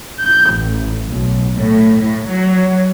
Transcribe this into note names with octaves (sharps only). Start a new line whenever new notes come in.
G6
A1
B1
A2
A2
F#3